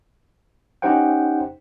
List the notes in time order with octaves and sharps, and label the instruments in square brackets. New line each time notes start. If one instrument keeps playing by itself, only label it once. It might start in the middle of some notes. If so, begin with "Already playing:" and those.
[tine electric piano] C#4 D#4 G4 C5 F#5 G5